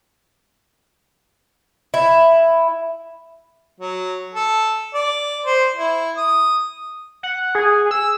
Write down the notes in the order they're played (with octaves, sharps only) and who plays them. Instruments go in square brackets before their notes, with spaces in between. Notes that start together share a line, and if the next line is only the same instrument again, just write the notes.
[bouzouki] E4
[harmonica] F#3
A4
D5
C5
E4
D#6
[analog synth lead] F#5
G#4
E6